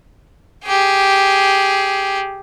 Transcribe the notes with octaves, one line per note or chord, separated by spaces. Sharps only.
G4 G#4